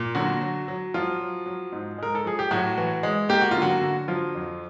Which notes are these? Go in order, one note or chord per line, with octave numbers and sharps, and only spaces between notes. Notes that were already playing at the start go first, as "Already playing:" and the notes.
Already playing: A#2
D3 F#3 F#4
F#3
F#3
F3 F#3 F4
F#3
F#3
G#2
G#3 A#4
A4
F3 G#4
G4
A2 F#3 F#4
E3
G#3
A#3 G4
F#4
F4
D3
F#3 F#4
D3
F3 F#3 F4
F2